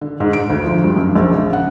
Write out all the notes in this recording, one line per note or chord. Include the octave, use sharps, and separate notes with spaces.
D3
G#2
D7
D2
F3
G2
F#2
A#1
C#3
F#5